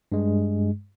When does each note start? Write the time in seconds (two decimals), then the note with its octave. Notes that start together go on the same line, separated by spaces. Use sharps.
0.12 G2 G#3